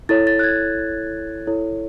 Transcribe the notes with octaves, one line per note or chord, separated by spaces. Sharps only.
E4 A4 C#5 A6
A6
F#6
G#6
E4 A4 C#5